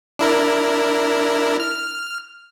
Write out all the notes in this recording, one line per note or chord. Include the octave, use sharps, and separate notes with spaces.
D4 E4 A#4
F6